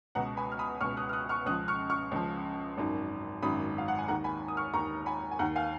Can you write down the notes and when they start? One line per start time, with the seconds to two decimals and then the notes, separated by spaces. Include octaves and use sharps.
0.15 C#2 B2 F#5 A#5
0.37 G#5 B5
0.52 F6
0.59 B5 D#6
0.80 C#2 B2 C#6 F6
0.97 D#6 F#6
1.09 F6
1.13 D#6 F#6
1.29 C#6 F6
1.46 C#2 C#3 F3 D#6 F#6
1.68 C#6 F6
1.90 C#6 F6
2.12 C#2 C#3 F3
2.77 G#1 F#2 D#3
3.42 G#1 F#2 D#3 B5 D#6
3.78 F5
3.88 F#5
3.99 G#5
4.08 D#2 D#3 F#5 A#5
4.24 G#5 B5
4.48 D#6
4.57 C#6 F6
4.73 D#2 D#3 A#5 C#6
5.06 G#5 B5
5.31 G#5
5.39 D#2 D#3 F#5 A#5
5.56 F5 G#5